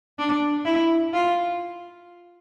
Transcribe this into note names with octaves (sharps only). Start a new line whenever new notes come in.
D4
E4
F4